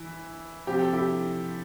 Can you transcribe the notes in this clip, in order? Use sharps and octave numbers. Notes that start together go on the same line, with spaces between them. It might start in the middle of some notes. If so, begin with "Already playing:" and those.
Already playing: E3 E4
C3 F3 G4
A4
E4 G4